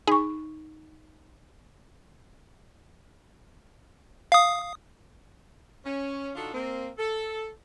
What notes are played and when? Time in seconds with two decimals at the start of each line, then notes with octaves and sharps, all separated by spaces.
0.07 D#4 G#4 C#6
4.32 F5 D#6
5.85 C#4
6.35 D3 D4 D#4 F4 F#4 A4
6.54 A#3 C4
6.98 A4